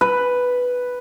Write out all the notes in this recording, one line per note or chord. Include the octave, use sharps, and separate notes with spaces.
B4